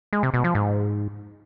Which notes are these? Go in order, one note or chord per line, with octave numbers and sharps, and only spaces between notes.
G#3
C3
B2
F3
G#2